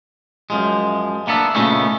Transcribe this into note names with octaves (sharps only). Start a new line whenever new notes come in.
F#2 F3 G#3
A#3 B3 D4 E5
A#2 C#3 A3 B3 C#4 D#4